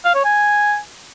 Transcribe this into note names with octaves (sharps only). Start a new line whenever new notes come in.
F5
C#5
G#5